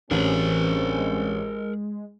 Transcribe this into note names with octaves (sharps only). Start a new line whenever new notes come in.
A1 G2 E3 C4 C#4 G#4 A#4
G#3